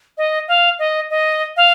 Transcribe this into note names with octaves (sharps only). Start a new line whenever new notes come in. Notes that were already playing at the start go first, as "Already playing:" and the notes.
D#5
F5
D#5
D#5
F5